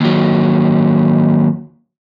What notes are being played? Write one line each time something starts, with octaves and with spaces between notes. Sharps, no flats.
D#2 F#3